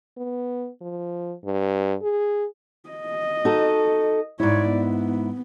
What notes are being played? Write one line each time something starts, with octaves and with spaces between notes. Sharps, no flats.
B3
F3
G2
G#4
D#5
D#4 F#4 A4
G#2 E4 C#5 D5
B3